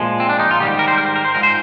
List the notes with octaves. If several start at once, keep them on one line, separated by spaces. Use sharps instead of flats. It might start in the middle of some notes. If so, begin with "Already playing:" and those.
Already playing: A#2 F3 G#3
C4
D4
D#4
F4
G#2 D#3 G3 G4
A#4
C5
A#4
C5
A#4
C5
G#2 F3 G#3 A#4
C5